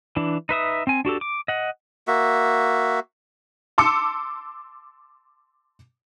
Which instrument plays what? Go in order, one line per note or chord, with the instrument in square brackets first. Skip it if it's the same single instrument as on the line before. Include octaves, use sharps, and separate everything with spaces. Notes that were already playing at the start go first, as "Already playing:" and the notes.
[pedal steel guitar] E3 D4
D#4 B4 E5 D#6
C4 G#5
D4 F#4 G4 A4
D6
D#5 F#5
[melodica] A#3 F#4 E5
[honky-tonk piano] A5 C6 D6 E6 C#7